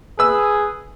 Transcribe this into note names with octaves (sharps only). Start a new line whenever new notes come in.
G#4 B4 E6